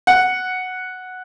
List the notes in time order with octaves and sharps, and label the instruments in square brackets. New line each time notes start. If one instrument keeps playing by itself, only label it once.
[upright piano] F#5